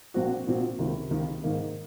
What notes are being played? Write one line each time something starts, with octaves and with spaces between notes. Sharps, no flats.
A#1 A#2 F3 C4 F#4
A#1 A#2 F3 C4 F#4
C#2 C3 D#3 A#3
C#2 C3 D#3 A#3
G#2 D#3 A#3 D#4